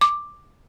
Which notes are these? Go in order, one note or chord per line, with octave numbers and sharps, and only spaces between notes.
D6